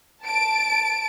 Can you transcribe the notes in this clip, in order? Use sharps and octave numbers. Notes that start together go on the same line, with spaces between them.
A5 D7